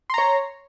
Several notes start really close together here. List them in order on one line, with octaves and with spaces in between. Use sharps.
C6 A#5 C#5